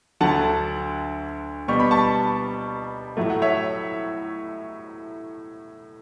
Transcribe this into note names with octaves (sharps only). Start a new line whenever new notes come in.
D2 D3 F#3 F#5 A5
B2 G3 B3 C#6
B5
A5 C#6
A2 F#3 A3
F#5
C#5 E5